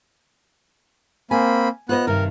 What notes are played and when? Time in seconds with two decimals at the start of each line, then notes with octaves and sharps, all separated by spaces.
1.31 A#3 C4 G#5 B5
1.89 B3 F4 C5 D#5 F#6
2.07 G2 C3 D#3 A#4